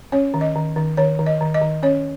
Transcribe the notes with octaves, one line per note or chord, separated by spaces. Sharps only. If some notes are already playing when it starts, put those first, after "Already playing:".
C#4 C#5
D#3
D#5
D#3
D#3
D#3 C#5
D#3
D#5
D#3
D#5
D#3
C#4 C#5